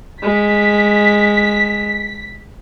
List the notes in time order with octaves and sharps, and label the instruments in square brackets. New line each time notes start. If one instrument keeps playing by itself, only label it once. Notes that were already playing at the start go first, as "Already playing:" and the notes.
[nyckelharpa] G#3 [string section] B6